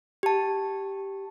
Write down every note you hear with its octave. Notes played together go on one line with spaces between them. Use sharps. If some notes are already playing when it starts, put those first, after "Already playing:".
G4 A5